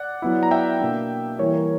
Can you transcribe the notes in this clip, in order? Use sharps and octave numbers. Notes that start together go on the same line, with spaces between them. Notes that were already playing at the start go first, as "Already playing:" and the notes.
Already playing: D5 F#5
F#3 B3 E4
A#5
E5 G5
B2 A#3 D4
E3 G3 A#3 E4 A#4 C#5
A#4